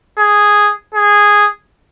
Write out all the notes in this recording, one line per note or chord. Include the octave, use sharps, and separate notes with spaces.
G#4
G#4